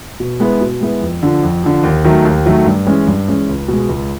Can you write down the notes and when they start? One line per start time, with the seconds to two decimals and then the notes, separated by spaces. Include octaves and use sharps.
0.20 B2
0.40 G#3 B3 E4
0.61 B2
0.81 G#3 B3 E4
1.01 F2
1.23 D3 F3
1.43 F2
1.64 D3 F3
1.83 D#2
2.04 D#3 F#3 A3
2.25 D#2
2.46 D#3 F#3 A3
2.66 G2
2.87 E3 G#3 C#4
3.07 G2
3.28 E3 G#3 C#4
3.49 C#2
3.68 B2 G#3
3.89 C#2